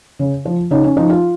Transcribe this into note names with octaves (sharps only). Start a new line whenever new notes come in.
C#3
F3
C#3 D#4
C#4
F3 D#4
F4